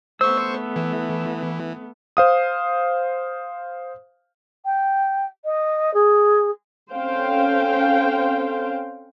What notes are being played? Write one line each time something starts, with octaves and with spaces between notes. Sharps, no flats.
A3 B3 C5 C#6 E6
E3
C5 F5 D#6
G5
D#5
G#4
C4 C#4 A4 C5 F5 G5